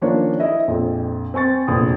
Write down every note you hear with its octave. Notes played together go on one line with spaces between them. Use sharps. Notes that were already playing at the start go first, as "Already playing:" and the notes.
D#3 F3 A#3 C#4 D4 C#5
E4 D#5 E5
A#1 F2
C4 G#5 C#6 A6
F1 A#1 E2 D#6